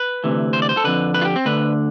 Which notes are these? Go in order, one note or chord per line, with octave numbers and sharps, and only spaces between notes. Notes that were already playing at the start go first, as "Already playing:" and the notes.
Already playing: B4
D2 C3 E3
C5
D5
C5
A4
F2 D3 B4
B4
F4
G4
C4
D2 D3 B4